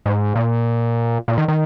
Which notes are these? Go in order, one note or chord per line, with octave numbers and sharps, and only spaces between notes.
G#2
A#2
A#2
D#3
D#3